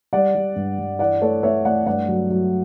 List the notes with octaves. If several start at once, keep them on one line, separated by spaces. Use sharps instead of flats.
G3 D5 F#5
G3
G2
G2
E3 D5 F#5
A3 A4 C#5
A3 C#5 E5
A3 D5 F#5
G2 D5 F#5
F#3
F#3